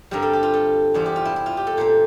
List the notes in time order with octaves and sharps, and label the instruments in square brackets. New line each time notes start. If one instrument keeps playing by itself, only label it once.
[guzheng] G2 D3 G3 C4 A#4
A4
G4
F4
A4
E2 C3 G3 C4 G4
G4
F4
E4
E4
F4
G4
A4
A#2 A3 C4 C5